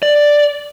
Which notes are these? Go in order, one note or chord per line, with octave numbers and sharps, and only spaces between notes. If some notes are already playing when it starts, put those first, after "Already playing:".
D5